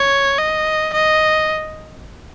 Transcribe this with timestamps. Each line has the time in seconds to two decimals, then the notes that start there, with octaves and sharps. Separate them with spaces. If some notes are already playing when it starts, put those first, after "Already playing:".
Already playing: C#5
0.38 D#5
0.93 D#5